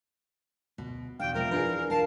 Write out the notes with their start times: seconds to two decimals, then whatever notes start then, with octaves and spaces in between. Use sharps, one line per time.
0.78 D2 B2
1.20 E2 B2 D4 F5 G5
1.34 G#2 C3 F3 A#4
1.51 E3 D4 F4 G4 G#4 B4
1.90 B1 A#4 F5 A5 C7